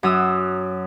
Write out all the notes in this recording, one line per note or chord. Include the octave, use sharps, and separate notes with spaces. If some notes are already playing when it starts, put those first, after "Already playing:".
F#2 F#3 D#6 E6